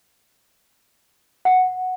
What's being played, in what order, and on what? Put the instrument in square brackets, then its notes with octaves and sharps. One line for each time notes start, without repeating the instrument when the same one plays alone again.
[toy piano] F#5